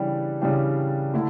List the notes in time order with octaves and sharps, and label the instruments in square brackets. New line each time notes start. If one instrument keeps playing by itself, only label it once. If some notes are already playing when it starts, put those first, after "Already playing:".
Already playing: [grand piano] C#3 E3 G3 D4 G4
C#3 E3 G3 D4 G4
D3 A3 E4